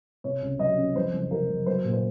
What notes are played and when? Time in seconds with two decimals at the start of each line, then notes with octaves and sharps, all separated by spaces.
0.24 C3 C#5
0.42 C#2
0.59 F#3 D#5
0.78 C#4
0.95 F2 C5
1.13 F#1
1.30 C3 A#4
1.49 F#1
1.66 F#3 C5
1.84 A#2
1.93 C5